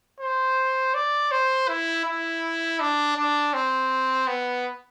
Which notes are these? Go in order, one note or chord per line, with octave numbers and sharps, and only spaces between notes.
C5
D5
C5
E4
E4
D4
D4
C4
B3